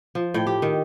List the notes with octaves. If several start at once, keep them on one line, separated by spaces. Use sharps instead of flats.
F3
A2 G5
G4
D#3